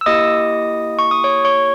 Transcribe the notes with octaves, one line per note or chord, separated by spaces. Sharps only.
E6
A#3 E4 G4 D#5 D#6
C#6
D#6
C#5 C#6
C#5 C#6